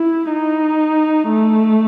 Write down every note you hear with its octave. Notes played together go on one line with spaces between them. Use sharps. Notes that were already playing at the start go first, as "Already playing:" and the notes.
Already playing: E4
D#4
A3